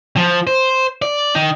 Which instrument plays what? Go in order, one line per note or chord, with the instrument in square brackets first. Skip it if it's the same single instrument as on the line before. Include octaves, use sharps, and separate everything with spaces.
[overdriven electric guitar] F3
C5
D5
D#3 D#4